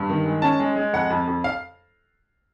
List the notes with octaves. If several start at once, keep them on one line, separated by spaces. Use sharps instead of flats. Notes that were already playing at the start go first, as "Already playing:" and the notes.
Already playing: G2
D#3
G#3
C#4 A5
G#3
G#3
F2 F#5
F2
F2
F5